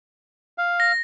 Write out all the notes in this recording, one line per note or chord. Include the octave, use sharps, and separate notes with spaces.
F5
A#6